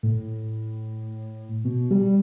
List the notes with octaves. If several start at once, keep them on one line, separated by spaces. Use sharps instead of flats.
A2
B2
G3